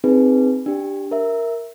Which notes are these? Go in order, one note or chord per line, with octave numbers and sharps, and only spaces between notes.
C4 D#4 G#4 B4
D4 G4
A#4 E5